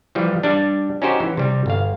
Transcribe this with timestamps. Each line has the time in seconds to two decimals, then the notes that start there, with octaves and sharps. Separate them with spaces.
0.15 E3 F3 G3
0.43 G3 D4
1.02 C#4 D#4 F#4 G4 C5
1.20 E3
1.37 C3 G3
1.66 G1 F5